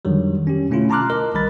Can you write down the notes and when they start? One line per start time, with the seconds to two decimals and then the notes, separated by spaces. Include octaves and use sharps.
0.05 F2 D3 D#3 F#3 G3
0.47 C#4 G4
0.70 B2 D3 A3 C#4 E4 F4
0.90 A5 A#5 C6 D6 F6 F#6
1.10 A#4 D#5
1.34 B1 D#3 G3 A#4 B5 A6